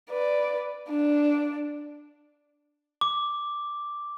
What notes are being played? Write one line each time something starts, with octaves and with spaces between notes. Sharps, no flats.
B4 D5
D4
D6